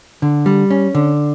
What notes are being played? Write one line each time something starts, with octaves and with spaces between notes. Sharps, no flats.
D3
G3
C#4
D3